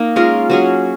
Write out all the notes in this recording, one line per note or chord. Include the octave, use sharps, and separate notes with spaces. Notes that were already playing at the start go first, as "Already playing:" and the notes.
Already playing: A#3 D#4
G#3 C#4 F4 A#4
F#3 C#4 G#4